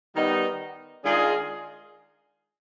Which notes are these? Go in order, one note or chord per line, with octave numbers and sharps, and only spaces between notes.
D#3 G3 B3 D#4
D#3 G#3 D4 F4 G#4